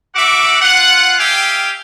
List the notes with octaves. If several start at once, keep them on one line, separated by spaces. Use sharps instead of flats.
F#4 E5 F#5 D6
F4 F#5
G4 E5 F5 G5 G#5